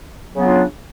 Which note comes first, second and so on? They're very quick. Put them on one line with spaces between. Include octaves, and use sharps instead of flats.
F#3 C#3 B3 F4 D4